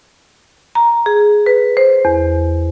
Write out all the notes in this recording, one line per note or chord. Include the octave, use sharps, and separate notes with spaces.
A#5
G#4
B4
C5
E2